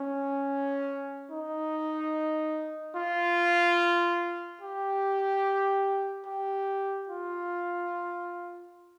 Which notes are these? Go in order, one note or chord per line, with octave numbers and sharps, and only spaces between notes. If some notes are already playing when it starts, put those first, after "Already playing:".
Already playing: C#4
D#4
F4
G4
G4
F4